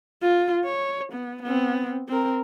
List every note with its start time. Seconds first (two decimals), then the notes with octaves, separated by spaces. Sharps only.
0.22 F4
0.64 C#5
1.13 B3
1.42 B3 C4
2.08 C4 A#4